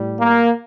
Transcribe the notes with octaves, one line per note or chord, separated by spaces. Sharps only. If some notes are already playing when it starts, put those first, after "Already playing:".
Already playing: A2 G3
A#3